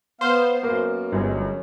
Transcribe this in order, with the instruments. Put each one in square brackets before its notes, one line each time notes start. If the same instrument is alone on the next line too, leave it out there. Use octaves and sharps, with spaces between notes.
[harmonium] B3 F5 [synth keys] C5 C6
[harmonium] F#2 [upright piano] A#3 B3
[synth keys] G1 G#3 [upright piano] D2